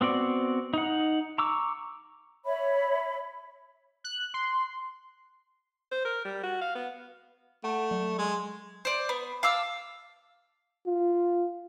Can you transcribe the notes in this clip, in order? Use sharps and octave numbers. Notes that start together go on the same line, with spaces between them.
B3 C4 F#4 D5
D#4 F#5
A#5 C#6 D6 E6
C#5 E5 B5
F#6
C6
C5
A#4
G3
F#4
F5
B3
A3 F#5
F#3
G#3 C6
C5 D5
B3
F5 A5 D6 E6
F4